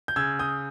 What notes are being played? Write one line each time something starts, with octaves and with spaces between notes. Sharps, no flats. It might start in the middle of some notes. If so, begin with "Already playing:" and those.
G6
C#3 E6 G#6
D#6 G6